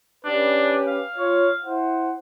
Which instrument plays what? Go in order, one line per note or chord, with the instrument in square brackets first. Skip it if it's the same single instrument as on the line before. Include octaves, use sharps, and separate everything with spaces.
[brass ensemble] C#4 G4 B4 [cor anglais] D4
[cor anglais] F5
[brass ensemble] F4 C#5
E4 C5 F#5